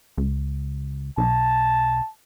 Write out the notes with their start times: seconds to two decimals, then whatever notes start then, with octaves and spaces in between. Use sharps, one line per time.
0.17 C#2
1.18 B1 A5